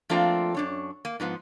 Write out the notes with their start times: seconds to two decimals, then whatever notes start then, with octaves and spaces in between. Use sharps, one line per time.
0.09 F3 A3 A#3 C4 D4 F4
0.54 F#2 D4 C#5
1.05 A#3
1.20 G#2 F3 B3